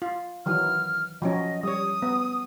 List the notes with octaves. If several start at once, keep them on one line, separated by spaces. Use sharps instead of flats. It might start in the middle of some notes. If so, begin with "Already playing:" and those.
F4
D#3 E3 F#3 F6
F3 F#3 C#4 D#5
G3 C#5 D#6
B3